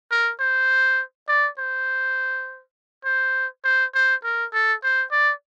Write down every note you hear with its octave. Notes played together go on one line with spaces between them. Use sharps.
A#4
C5
D5
C5
C5
C5
C5
A#4
A4
C5
D5